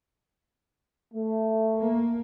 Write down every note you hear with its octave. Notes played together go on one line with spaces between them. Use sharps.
A3
A#3